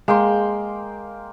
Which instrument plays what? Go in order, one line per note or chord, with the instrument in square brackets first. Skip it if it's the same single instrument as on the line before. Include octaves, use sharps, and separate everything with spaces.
[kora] G#3 [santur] A#3 G5 C6